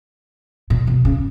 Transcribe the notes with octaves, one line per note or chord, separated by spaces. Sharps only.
A#2
B2
C#3